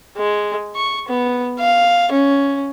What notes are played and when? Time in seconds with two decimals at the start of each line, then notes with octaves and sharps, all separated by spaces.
0.17 G#3
0.75 C#6
1.08 B3
1.59 F5
2.12 C#4